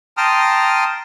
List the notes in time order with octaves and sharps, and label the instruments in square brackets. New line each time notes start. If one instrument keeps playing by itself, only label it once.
[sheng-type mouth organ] G5 A5 A#5 C6 D#6 F6